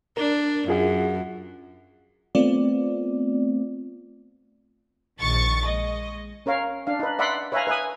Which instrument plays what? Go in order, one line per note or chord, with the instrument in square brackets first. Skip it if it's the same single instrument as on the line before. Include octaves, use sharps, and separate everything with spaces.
[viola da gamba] D4 [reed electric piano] A#4
[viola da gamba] F#2 [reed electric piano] F4 G#4 F#5
[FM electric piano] A3 B3 C4 F4 D5
[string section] A#1 D#3 C#6 A6
G#3 D#5
[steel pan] C#4 A#4 C#5 F5
D4 F5
D#4 B4
D5 E5 F#5 B5 C6
B4 C#5 E5 F5 G#5 A#5
B4 E5 G#5 D#6